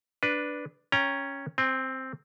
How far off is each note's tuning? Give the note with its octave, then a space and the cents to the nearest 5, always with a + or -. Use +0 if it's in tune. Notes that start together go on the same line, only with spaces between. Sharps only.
D4 +0 B4 +0
C#4 +0 G5 +25 A#5 +0
C4 +0 G5 +45